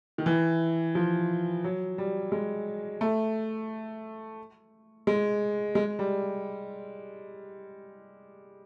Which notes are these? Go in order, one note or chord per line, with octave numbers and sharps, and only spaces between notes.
D#3
E3
F3
F#3
G3
G#3
A3
G#3
G#3
G3